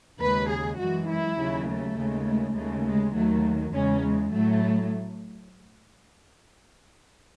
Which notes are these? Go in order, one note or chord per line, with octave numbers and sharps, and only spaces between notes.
D#2 C#3 G#3 B4
G#4
F#2 E3 G#3 F#4
E4
D#2 C#3 F#3
A3
D#2 C#3 G#3
A3
D#2 C#3 G#3 A3
G#3
D#2 D#3 F#3 A3
E2 C#3 G#3 C#4
G#3
A2 F#3 A3